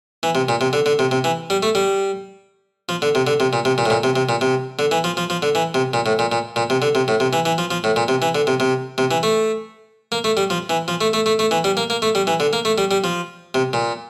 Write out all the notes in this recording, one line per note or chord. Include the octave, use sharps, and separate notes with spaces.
E3
C3
A#2
C3
D3
D3
C3
C3
E3
G3
A3
G3
F3
D3
C3
D3
C3
A#2
C3
A#2
A2
A#2
C3
C3
A#2
C3
D3
E3
F3
F3
F3
D3
E3
C3
A#2
A2
A#2
A#2
A#2
C3
D3
C3
A2
C3
E3
E3
F3
F3
A2
A#2
C3
E3
D3
C3
C3
C3
E3
A3
A#3
A3
G3
F3
E3
F3
A3
A3
A3
A3
E3
G3
A#3
A#3
A3
G3
E3
D3
A#3
A3
G3
G3
F3
C3
A#2